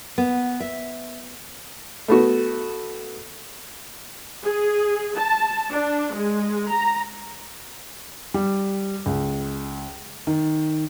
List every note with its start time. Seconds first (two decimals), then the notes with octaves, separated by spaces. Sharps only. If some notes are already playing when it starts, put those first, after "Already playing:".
0.18 B3
0.60 E5
2.08 A3 B3 F#4
4.43 G#4
5.17 A5
5.70 D4
6.14 G#3
6.71 A#5
8.34 G3
9.06 C#2
10.27 D#3